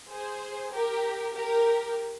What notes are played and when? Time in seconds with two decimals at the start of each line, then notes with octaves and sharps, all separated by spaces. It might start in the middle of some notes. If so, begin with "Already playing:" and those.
0.10 G#4 C5
0.73 G4 A#4
1.34 G4 A#4